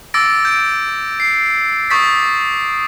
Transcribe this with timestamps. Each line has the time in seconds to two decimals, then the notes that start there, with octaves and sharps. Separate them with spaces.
0.14 D6 E6 A6 A#6 D7
0.45 G6 D7
1.20 C7
1.90 C#6 D#6 G6 A6 B6